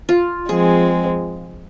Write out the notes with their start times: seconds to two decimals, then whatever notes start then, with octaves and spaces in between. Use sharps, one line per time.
0.09 F4
0.49 F3 G#3 C4 G#4